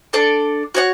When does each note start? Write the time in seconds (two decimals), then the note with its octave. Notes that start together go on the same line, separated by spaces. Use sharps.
0.13 D4 A4 D5
0.75 F#4 C#5 F#5